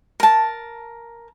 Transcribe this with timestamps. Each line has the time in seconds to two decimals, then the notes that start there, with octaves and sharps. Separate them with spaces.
0.20 A#4 A5